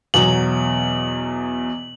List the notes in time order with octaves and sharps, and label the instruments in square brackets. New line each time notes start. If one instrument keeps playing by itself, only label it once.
[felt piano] E2 B2 F#3 [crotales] F#7